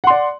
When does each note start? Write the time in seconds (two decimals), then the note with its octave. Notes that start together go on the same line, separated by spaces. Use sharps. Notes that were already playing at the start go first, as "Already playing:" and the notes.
0.04 F#5
0.07 C6
0.10 D5